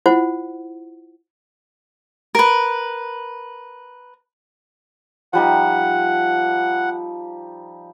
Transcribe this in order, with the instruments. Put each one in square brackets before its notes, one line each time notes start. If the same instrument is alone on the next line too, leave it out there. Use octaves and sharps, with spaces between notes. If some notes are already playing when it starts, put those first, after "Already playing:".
[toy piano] E4 F4 C5 F#5
[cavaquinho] A#4 B4
[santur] F3 G3 D#4 [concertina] F#5